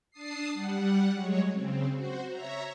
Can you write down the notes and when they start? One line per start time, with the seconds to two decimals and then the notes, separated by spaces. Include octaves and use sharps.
0.11 D4 A5 D#6 C7
0.53 G3 F#5
1.14 F#3 G#3 C#5
1.53 C#3 C4
1.93 F#4 C5
2.29 C#5 E5 A#5